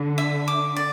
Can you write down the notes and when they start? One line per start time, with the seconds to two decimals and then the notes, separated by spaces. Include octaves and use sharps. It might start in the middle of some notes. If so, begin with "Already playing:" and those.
Already playing: D3
0.18 E5
0.48 D6
0.76 D5